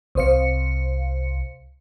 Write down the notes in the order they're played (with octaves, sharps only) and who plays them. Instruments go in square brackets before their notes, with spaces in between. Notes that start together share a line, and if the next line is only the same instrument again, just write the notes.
[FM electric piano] C2 C3 C5 F5 C#7